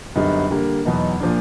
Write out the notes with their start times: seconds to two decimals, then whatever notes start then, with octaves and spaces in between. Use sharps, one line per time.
0.15 F#2 D3 G3 B3 D#4
0.51 D3 G3 A#3
0.85 E2 B2 F#3 B3 D#4
1.20 A#2 F3 A#3 D4